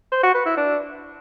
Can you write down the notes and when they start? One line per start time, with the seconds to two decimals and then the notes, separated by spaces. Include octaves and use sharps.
0.12 C5
0.23 F#4
0.34 B4
0.46 E4
0.57 D4